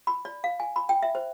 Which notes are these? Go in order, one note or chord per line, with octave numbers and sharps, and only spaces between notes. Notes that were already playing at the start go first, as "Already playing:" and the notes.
B5
D5
F5
G#5
B5
G5
E5
C5